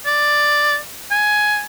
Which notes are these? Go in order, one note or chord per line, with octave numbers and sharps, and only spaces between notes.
D5
G#5